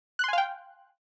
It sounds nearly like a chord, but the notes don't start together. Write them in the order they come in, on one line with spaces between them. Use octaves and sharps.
F#6 C6 G#5 F5 G5